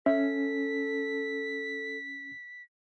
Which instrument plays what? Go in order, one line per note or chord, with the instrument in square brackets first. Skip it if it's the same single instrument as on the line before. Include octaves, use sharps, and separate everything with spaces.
[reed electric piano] C#4 [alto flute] A4 [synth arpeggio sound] E5 [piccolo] B6